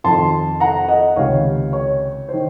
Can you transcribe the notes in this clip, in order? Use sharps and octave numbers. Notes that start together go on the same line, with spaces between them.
F2 D#3 A5 C6
F#5 A#5
D#5 F#5
C#2 C3 D#3 C#5 F5
C#5
D#3 C5